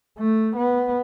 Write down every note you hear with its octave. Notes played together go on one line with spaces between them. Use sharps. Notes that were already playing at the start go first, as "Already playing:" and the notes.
A3
B3